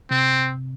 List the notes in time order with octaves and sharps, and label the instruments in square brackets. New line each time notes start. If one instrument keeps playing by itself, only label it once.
[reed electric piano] C3 [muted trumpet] C4